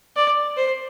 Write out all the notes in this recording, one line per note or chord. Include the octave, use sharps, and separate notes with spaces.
D5
C5